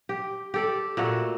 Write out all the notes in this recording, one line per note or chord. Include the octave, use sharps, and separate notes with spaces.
G4
G4 A4 D5
A#2 A3 F#4